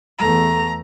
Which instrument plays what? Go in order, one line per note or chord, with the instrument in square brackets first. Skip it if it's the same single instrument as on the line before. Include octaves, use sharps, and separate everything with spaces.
[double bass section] E2 A3 [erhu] A#5